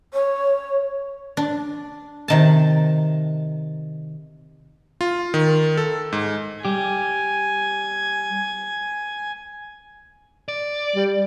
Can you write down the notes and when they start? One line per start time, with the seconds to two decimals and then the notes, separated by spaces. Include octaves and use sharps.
0.13 C#5
1.37 D4
2.28 C3 D#3 A5
5.01 F4
5.34 D#3
5.77 A4
6.13 G#2
6.65 G3 G4 G#5
10.48 D5
10.96 G3